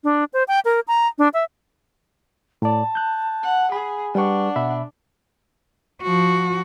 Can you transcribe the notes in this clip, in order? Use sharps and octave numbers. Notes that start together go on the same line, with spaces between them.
D4
C5
G5
A#4
A#5
D4
E5
A2 D5 A5
F#6 G6
F#5
G#4 B5
G3 D4 B4 F#5 C#6
B2 E5 B5
F3 F#4